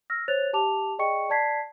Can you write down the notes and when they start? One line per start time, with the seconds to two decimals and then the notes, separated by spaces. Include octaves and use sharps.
0.10 E6 F6 A#6
0.28 C5 C#5 F#6 A6 F7
0.53 G4 A5 D6 F7
0.99 G#4 D5 D#5 G5 C#6 C#7
1.30 D5 A5 G#6 B6 C7